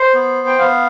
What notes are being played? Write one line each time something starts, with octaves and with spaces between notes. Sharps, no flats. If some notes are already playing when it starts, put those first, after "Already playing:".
Already playing: C5
B3
G5
B3 F5